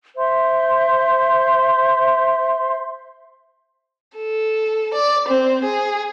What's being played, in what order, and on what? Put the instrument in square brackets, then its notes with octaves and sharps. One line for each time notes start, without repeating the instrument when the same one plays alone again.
[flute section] C5 E5 C6
[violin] A4
D5
C4
G#4